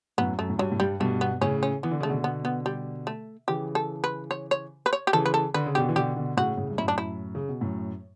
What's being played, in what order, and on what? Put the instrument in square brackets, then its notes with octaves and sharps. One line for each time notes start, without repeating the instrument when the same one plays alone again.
[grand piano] F#2 A2 [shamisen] B3
[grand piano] F#2 [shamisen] A3
[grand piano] A2
[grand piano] G2 [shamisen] F#3
[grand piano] A2
[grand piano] G2 [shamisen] G3
[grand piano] G2 B2 [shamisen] A3
[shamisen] B3
[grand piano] A2 C#3 [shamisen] C#4
[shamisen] C#4
[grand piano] E3 [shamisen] B3
[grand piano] D3
[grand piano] C#3 [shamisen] A3
[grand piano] B2 D3
[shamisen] B3
B3
G3
A3
[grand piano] C#3 E3 [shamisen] G4
[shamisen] A4
B4
C#5
C#5
B4
C#5
G4
[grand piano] C#3 E3 [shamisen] A4
[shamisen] B4
A4
[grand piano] D3 [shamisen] B4
[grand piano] C#3
[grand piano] B2 D3 [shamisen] G4
[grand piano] E3
[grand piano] B2 D3 [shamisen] G4
[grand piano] B2 D3
[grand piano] A2 C#3 [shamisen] F#4
[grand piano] A2 C#3
G2
[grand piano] F#2 A2 [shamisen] E4
[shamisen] D4
E4
[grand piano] C#3
B2
F#2 A2